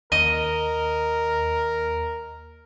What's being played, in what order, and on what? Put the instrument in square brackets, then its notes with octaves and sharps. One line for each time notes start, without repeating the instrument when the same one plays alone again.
[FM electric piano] D#2 [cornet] A#4 [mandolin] D#5